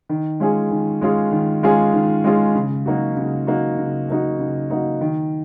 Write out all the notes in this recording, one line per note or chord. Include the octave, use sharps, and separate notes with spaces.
D#3
G#3 C#4 F4 G#4
D#3
G#3 C#4 F4 G#4
D#3
G#3 C#4 F4 G#4
D#3
G#3 C#4 F4 G#4
C#3
F#3 A#3 D#4 F#4
C#3
F#3 A#3 D#4 F#4
C#3
F#3 A#3 D#4 F#4
C#3
F#3 A#3 D#4 F#4
D#3